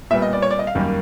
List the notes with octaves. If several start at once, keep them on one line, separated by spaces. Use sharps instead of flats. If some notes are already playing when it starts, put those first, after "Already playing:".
A#2 G3 B3 E5
D#5
D5
C#5
D5
D#5
F5
F#2 D#3 G3 A#3